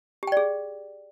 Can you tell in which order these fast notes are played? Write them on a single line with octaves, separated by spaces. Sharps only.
G4 G5 D5 G#4